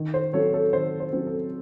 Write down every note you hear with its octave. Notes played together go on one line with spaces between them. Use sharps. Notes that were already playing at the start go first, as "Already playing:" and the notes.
Already playing: D#3
C5
F#3 C4 A4 C#5
A4 C#5
D#3 C5
C5
F#3 C4
A4